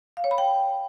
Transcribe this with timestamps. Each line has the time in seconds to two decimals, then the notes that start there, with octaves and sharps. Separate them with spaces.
0.17 F5
0.24 C#5
0.31 B5
0.38 G5